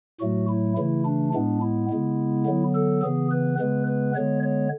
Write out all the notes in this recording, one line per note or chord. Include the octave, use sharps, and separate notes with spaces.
A2 F#3 A3 F#4
E4
C#3 E3 A3 E4
D4
A2 G#3 B3 D4
E4
C#3 G#3 B3
D3 F#3 B3
A4
C#3 E3 B3 G#4
B4
C#3 G#3 B3 B4
B4
D3 G#3 B3 C#5
C#5